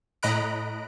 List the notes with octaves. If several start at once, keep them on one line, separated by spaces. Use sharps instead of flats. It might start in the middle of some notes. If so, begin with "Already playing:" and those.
A2 D#5 A#5 B5 F#6 D7